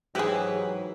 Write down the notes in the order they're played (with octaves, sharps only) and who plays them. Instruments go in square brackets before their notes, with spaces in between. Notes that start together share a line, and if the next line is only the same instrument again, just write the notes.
[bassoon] G#2 [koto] E3 E4 B4 [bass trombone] F#3 [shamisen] G4 G#4